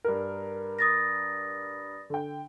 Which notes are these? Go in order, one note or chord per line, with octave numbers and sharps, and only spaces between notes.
G2 A#4
D#6 A6 A#6
D3 G5